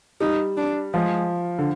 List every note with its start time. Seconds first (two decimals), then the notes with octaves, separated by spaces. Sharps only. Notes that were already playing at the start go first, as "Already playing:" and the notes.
0.21 G3 D#4
0.57 D4
0.94 F3 G#3
1.59 D3